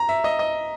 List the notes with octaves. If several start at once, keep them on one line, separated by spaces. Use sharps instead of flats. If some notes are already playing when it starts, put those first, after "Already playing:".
Already playing: A#5
E5
D#5
D#5